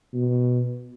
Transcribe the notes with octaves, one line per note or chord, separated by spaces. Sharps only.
B2